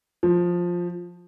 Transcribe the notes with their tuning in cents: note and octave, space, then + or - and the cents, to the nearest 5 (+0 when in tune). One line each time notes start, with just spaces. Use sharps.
F3 +10